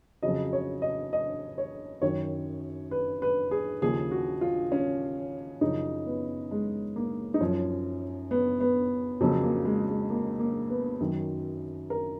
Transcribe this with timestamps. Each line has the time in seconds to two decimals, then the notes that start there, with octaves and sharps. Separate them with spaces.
0.23 F2 C#3 F#3 D#5
0.53 C#5
0.82 D#5
1.13 D#5
1.58 C#5
2.02 F#2 D#3 F#3 C#5
2.91 B4
3.22 B4
3.51 G#4
3.82 D#2 C#3 F3 G#4
4.11 F#4
4.41 F4
4.72 C#4
5.61 F#2 C#3 F3 D#4
6.06 B3
6.51 G#3
6.96 A#3
7.34 D#4
7.41 F#2 F3 C#4
8.31 B3
8.60 B3
9.21 F2 C#3 F#3 A#3
9.43 A#3
9.65 G#3
9.87 G#3
10.10 A#3
10.39 A#3
10.70 B3
11.00 F#2 D#3 F#3
11.90 A#4